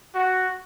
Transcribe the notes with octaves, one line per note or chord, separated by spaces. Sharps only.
F#4